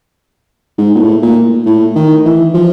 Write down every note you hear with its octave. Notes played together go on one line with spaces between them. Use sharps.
G#2
A#2
A2
A#2
A2
D#3
E3
F3